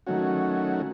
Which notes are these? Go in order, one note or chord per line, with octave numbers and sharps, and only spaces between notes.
D#3 F#3 A3 C#4 F#4